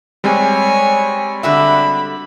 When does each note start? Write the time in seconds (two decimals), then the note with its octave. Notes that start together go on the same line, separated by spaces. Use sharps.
0.24 G3 G#3 C4 C#5 G#5
1.43 D3 D4 F#4 E5 B5